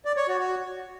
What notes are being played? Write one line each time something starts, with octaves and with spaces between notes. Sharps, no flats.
D5
C#5
F#4
F#4